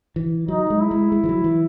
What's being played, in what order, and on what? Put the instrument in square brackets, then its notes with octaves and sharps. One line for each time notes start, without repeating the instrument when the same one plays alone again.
[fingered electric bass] E3
[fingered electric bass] F#3 [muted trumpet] D#4
[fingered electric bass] G#3
[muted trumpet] E4
[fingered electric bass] G#3
G#3
E3
F#3
E3